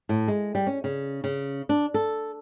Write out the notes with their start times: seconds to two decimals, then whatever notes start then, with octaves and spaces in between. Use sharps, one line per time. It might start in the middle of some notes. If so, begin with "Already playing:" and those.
0.09 A2
0.28 G#3
0.55 G3
0.67 C#4
0.84 C#3
1.24 C#3
1.69 D4
1.94 A4